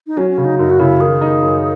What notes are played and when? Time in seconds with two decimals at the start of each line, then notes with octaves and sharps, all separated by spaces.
0.07 D#4
0.17 F#3 C#4
0.31 C#4
0.38 C#3
0.44 D#4
0.59 F#2 D#4
0.70 F#4
0.79 C#3 E4
1.00 D#3 G#4
1.21 D#4
1.42 F#2